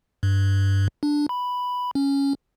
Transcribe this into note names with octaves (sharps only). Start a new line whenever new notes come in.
G2
D4
B5
C#4